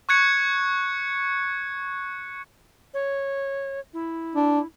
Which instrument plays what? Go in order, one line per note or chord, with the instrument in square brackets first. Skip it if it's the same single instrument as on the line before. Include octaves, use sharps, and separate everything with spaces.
[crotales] C#6 F#6 G#6 C#7
[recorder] C#5
E4
[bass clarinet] D4